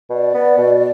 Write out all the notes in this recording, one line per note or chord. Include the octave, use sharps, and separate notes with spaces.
B2 D5
B3
B2